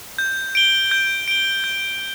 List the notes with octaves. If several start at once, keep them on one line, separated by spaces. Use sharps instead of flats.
G6
D7 G7
G6
D7 G7
G6